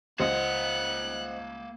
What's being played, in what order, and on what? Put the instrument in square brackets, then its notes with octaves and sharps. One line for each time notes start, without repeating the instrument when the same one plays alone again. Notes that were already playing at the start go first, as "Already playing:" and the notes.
[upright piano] C#2 [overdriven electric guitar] A#3 F#5 [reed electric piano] C5 D#5 [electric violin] F#6